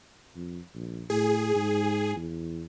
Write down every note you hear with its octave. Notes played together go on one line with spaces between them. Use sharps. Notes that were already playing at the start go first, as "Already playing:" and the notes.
F2
A#1
A2 G#4
G#2
E2